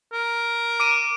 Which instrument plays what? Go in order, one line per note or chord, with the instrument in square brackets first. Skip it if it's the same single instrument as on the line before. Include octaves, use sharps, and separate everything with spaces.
[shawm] A#4
[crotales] D6 D7 D#7